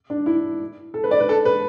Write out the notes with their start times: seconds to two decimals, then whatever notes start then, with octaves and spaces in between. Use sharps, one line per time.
0.10 D4
0.26 E4
0.94 A4
1.04 B4
1.11 D5
1.20 B4
1.29 A4
1.45 B4